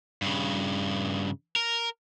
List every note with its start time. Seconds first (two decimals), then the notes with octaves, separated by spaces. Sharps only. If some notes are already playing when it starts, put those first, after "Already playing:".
0.22 G2 C#3
1.56 A#4